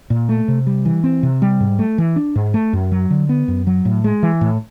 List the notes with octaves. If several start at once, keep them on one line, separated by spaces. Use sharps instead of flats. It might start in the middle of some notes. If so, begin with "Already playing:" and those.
A#2
A3
C3
G3
E3
C4
C3
G3
G#2
A3
E3
D4
G#2
A3
F#2
F#3
D3
B3
F#2
F#3
A2
G#3
E3
A2